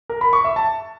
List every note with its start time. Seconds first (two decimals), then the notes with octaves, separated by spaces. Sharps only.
0.09 A#4
0.21 B5
0.33 C#6
0.44 E5
0.56 A5